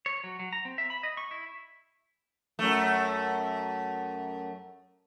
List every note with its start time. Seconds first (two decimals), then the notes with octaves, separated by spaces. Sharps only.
0.06 C#5
0.24 F#3
0.40 F#3
0.53 A#5
0.65 C4
0.78 E5
0.90 B5
1.03 D#5
1.17 C#6
1.31 E4
2.59 F#2 A3